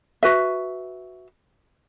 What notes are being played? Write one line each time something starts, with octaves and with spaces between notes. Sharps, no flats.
F#4 B4 E5